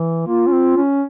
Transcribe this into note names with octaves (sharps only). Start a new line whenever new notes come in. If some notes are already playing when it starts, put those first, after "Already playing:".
Already playing: E3
A#3 F4
C#4
C4
C#4